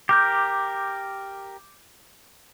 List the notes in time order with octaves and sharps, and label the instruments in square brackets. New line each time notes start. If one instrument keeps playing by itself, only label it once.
[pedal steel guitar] G4 A#4 [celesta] D6 G6